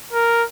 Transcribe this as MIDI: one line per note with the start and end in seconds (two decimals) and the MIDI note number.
0.13 0.44 70